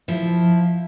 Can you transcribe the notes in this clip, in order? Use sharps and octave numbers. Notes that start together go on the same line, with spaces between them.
F3 E4